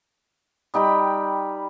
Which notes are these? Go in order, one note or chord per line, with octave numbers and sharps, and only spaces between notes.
G3 D#4 G5 B5